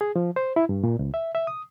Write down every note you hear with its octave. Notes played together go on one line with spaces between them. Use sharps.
G#4
F3
C5
E4
G2
A#2
C#2
E5
E5
D#6